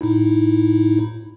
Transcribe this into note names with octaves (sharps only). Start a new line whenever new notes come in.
A2 D#4 E4